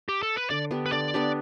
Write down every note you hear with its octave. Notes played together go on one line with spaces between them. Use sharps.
G4
A4
B4
D3 D5
B3 D4 G4
B4
D3 D5
B3 D4 G4